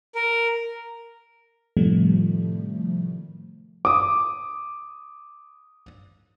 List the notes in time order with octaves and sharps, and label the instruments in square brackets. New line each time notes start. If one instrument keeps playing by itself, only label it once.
[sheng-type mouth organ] A#4
[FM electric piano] A2 C3 D#3 F3 G3 A3
[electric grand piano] D6 D#6